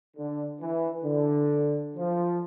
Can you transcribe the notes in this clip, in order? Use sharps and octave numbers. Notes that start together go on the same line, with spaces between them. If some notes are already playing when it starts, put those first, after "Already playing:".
D3
E3
D3
F3